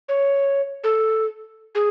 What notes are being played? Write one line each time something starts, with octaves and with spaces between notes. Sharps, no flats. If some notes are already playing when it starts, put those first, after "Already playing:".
C#5
A4
G#4